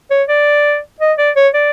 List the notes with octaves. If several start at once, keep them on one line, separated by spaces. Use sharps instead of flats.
C#5
D5
D#5
D5
C#5
D5